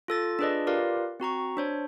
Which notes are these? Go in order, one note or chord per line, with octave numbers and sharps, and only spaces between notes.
F4 A4 A6
D4 F4 G#4 B4 D5 D#5
F4 G4 A#4 B4 D5 F5
C4 F#4 A#5 C#6
D4 C5 C#5